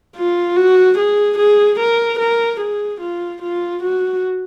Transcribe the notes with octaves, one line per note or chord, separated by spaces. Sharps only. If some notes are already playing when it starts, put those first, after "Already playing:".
F4
F#4
G#4
G#4
A#4
A#4
G#4
F4
F4
F#4